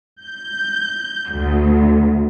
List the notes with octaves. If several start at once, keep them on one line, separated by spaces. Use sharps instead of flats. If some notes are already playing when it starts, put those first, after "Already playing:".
G6
D2